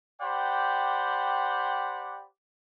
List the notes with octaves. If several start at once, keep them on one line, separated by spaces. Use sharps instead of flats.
G4 C5 D5 F#5 G5 B5